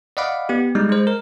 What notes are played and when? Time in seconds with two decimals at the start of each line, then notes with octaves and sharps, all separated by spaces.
0.17 D5 D#5 F5 F#5 B5 D6
0.49 B3 G4
0.75 G3 G#3 D#4
0.89 G#3 C5
1.07 A#4